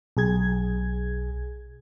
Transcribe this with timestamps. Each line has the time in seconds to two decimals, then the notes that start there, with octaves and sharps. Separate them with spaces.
0.17 B1 G#4 G#6